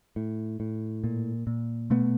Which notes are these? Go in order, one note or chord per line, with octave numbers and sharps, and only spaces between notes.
A2
A2
A#2
A#2
B2 A3 B3